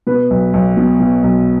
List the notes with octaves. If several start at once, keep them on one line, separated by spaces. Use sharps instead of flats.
B2 B4
B1
B1
B2
B2
B1